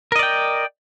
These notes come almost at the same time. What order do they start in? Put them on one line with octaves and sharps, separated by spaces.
A#4 D#5 D5 G5